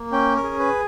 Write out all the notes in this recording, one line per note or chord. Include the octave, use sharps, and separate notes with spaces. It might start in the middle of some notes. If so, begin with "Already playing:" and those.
Already playing: A#3
C#4 G5
A#4
G#4
B4